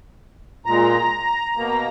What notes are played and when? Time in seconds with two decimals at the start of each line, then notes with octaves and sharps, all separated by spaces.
0.65 A#2 G#3 A#5
1.56 B2 A#3